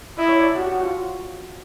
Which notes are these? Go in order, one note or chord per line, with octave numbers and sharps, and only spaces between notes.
E4 D#5
C#5
D5
F#4
G4
F#4
F4